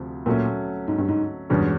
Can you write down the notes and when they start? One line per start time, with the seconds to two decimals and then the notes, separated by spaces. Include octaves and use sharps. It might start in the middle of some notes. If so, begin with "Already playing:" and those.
Already playing: D2 C3 F3
0.26 A#2 F#3 A3 C#4
0.88 G#2
0.98 G2
1.08 G#2
1.50 E2 G2 B2 G#3 C#4